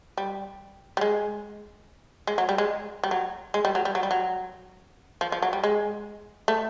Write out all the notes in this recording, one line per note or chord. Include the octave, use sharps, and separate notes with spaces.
G3
G3
G#3
G#3
F#3
G3
G#3
G3
F#3
G#3
G3
F#3
G3
F#3
G3
F#3
F3
F3
F#3
G3
G#3
A3